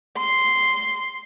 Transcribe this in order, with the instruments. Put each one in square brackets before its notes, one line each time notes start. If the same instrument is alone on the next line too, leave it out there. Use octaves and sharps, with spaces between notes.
[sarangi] C6